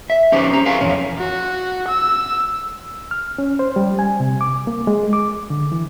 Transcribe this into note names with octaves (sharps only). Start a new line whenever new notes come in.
E5
C#4 D#4 G4 B4 C5
C#4 A#5
G#4 A#4 F5 G#5
F2 B2 E3 C#4
F#4
E6
F6
C#4
C5
G3
G#5
C3
D6
A#3
G#3
D6
D3
E3